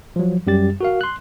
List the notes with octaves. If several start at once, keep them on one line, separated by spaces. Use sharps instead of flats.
F3 F#3
F#2 G3 G4 A6
F#4 A#4 F5
C6 F#6